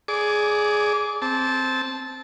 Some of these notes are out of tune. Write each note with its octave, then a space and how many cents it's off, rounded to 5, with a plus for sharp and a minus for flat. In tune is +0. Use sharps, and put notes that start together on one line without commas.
G#4 +10 D5 -5 D6 -25
C4 +0 A5 -15 E6 -30